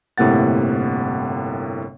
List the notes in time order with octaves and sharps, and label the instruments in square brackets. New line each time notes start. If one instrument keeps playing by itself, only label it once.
[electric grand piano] G1 A2 C3 A#3 F#5 A6